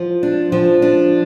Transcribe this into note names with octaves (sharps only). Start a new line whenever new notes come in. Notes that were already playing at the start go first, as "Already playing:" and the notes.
Already playing: F3
D4
F3
D4